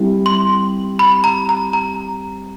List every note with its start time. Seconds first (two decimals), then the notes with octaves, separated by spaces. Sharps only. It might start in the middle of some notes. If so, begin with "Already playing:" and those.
Already playing: G3 C4 E4
0.26 C6
0.99 B5
1.24 A#5
1.49 A#5
1.73 A#5